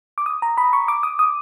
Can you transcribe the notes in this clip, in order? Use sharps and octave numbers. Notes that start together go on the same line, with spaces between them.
D6
D#6
A#5
B5
C#6
D6
D#6
D#6